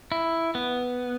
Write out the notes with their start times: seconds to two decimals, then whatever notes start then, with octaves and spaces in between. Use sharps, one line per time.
0.12 E4
0.55 B3